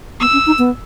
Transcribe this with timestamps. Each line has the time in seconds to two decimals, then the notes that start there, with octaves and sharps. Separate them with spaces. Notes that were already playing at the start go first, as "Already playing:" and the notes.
0.20 B3 E6
0.33 C#4
0.46 D#4
0.59 B3